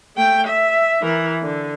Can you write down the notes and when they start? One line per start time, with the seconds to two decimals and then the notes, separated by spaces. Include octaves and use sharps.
0.16 A3 G5
0.47 E5
1.02 E3 A#4
1.43 D3